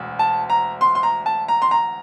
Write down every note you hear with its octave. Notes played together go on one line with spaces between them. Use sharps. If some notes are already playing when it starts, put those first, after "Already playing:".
Already playing: E1 D2
A5
A#5
C6
C6
A#5
A5
A#5
C6
A#5